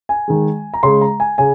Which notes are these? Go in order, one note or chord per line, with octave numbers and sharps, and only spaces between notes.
G#5
D#3 G#3
A#5
C#3 G#3 C6
A#5
G#5
C#3 G#5